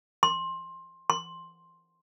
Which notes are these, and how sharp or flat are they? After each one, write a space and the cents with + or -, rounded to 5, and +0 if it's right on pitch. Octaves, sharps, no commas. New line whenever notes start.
C6 +20
C6 +5